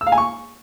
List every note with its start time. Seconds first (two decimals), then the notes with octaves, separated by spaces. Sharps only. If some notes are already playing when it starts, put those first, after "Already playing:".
0.01 E6
0.07 F5
0.12 G#5
0.18 C#6